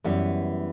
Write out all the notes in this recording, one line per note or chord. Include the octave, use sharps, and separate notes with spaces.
F#2 E3 G3 B3